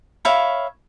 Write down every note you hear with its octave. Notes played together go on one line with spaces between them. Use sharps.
C#5 E5 F5 B5